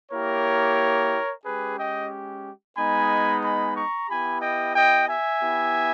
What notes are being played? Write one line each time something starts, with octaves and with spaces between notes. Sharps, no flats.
A#3 E4 G4 A#4 C#5
G#3 C#4 G4 G#4 B4
D#5 G5
G#3 B3 D#4 G#5 B5
G#5 B5
A#5 C#6
B3 E4 G4 G#5 B5
D#5 G5
D#5 G5
E5 G#5
B3 E4 G4